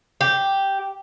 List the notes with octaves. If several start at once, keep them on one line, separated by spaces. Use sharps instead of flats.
G4